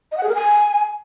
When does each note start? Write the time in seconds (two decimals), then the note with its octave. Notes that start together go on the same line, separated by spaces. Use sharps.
0.12 D#5
0.17 F#5
0.23 G#4
0.29 A#4
0.35 G#5